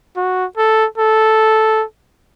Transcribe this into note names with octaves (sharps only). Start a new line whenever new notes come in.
F#4
A4
A4